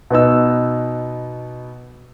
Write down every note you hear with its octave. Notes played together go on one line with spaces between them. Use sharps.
B2 B3 D#4 E6